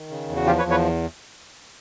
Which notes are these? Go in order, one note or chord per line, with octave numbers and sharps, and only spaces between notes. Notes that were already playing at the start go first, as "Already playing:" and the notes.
Already playing: D#3
C#3
E2
F#4
F3 F4 G4
B4 C#5
E2
B4 C#5